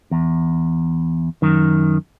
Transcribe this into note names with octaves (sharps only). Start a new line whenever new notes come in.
E2
F#2 D#3